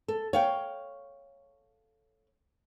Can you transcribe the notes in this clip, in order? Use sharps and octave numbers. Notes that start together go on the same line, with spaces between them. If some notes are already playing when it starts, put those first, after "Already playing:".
A4
C#5 F5 G5